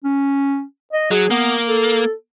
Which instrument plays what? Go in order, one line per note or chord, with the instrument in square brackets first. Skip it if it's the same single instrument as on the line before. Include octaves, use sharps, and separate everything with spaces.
[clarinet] C#4
D#5
[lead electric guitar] F#3 [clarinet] G#4
[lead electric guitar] A#3 [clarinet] B3
[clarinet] A4